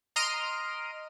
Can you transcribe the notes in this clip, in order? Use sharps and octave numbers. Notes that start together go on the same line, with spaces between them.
D#5 A#5 C6 F6 D7 D#7